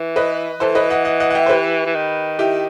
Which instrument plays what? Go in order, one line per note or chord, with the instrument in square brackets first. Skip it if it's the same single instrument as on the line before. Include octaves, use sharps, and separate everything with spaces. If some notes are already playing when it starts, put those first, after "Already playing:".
Already playing: [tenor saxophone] E3
[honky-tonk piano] B4 D#5
[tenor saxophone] E3 [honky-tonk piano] A4 C5
[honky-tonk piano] B4 D#5
D#5 F#5
D#5 F#5
D#5 F#5
F#5
E5 G5
C5
G4 B4
[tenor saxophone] E3
D#3
[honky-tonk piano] E4 G4